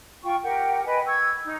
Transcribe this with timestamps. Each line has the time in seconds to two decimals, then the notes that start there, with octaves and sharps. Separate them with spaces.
0.23 F4 G5 C#6
0.43 G4 A#4 F#5 G5
0.85 B4 D#5 G5 G#5
1.06 C#6 E6 G#6
1.44 D#4